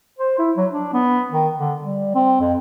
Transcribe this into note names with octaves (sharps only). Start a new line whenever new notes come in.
C5
E4
F#3
D4
B3
D#3
D3
G3
C4
F2